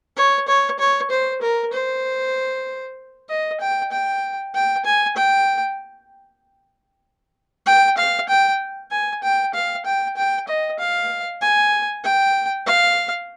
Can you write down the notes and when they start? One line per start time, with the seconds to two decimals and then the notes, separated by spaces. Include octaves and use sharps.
0.16 C#5
0.48 C#5
0.79 C#5
1.10 C5
1.42 A#4
1.73 C5
3.29 D#5
3.60 G5
3.91 G5
4.54 G5
4.85 G#5
5.16 G5
7.66 G5
7.97 F5
8.29 G5
8.91 G#5
9.22 G5
9.54 F5
9.85 G5
10.17 G5
10.48 D#5
10.79 F5
11.41 G#5
12.04 G5
12.66 F5